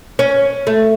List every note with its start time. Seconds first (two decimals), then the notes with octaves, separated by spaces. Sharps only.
0.19 C#4
0.67 A3